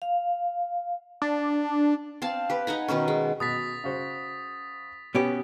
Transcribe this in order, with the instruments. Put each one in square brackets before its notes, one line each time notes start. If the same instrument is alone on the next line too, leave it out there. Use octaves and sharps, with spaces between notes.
[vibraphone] F5
[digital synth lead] D4
[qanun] C4 F5 A5
G4 B4
D#4 F#5 G#5 A#5
B2 D#3 B3 C#4
G#3
[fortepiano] B2 [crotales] D#6 A6 B6
[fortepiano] C#3 F#4 C5
[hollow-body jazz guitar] B2 C#4 G4 [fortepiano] B3